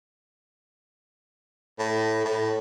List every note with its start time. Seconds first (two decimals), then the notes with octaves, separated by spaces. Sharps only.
1.79 A2
2.25 A2